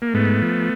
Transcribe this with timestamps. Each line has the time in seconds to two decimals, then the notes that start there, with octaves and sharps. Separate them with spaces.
0.02 A#3
0.14 G#2 A3 B3
0.42 F3